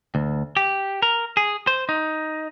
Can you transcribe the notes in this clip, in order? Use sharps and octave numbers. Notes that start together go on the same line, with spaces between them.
D2
G4
A#4
G#4
C5
D#4